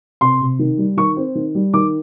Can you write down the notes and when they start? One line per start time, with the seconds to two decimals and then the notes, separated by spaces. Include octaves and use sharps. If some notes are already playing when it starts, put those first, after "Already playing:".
0.21 C3 C6
0.41 C3
0.59 D#3
0.78 G3
0.97 D#3 C#6
1.17 C4
1.35 D#3
1.55 G3
1.73 D#3 D6